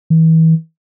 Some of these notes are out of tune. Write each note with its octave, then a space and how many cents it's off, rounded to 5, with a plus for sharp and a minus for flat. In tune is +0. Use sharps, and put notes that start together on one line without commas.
E3 -35